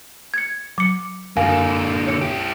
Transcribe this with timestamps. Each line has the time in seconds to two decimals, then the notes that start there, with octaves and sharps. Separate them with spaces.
0.34 G#6 C#7
0.78 F#3 D6 C#7
1.37 F#2 D3 A#3 A#4 F5 G#5
2.07 C#5 C#7
2.21 E4 G4